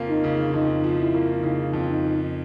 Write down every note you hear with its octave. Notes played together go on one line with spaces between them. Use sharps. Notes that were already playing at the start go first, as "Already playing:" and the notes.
Already playing: F2 C#3 F3 A#3
D#4
C#3
F2 D#4
F3
E4
A#3
C#3 D#4
F2
D#4
F3